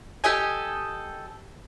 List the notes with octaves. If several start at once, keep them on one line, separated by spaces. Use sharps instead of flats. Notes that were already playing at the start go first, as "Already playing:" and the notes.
G4 A4 D#5 G#5